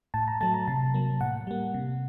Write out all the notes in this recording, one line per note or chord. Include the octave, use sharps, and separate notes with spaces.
A2 A5
A#5
F#3 A3 A5
A#5
C3 A5
F#3 A#3
A2 F#5
G3 A#3
C3